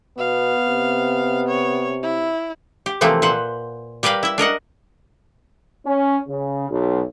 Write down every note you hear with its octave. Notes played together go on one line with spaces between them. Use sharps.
B2 B3 F5
C3
C#5
E4
G4
C3 E3 F3 A3 A#3 C4
A#2 B4 C5 F#5
G3 G4 A#4 B4 F5
E4 E5
D4 A#4 D#5 F#5
C#4
C#3
B1